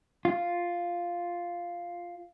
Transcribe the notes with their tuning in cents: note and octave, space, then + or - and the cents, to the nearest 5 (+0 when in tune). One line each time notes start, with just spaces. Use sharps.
F4 +0